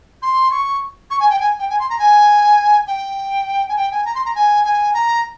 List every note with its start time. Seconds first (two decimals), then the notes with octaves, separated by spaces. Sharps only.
0.22 C6
0.51 C#6
1.11 C#6
1.20 G#5
1.30 G5
1.40 G#5
1.59 G5
1.70 G#5
1.79 C6
1.90 A#5
1.99 G#5
2.87 G5
3.69 G#5
3.76 G5
3.91 G#5
4.05 A#5
4.15 C6
4.25 A#5
4.35 G#5
4.65 G#5
4.94 A#5